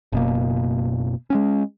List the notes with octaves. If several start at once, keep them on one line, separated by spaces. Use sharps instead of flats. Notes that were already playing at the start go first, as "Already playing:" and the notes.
F#1 B2 A#3
G#3 B3 C#4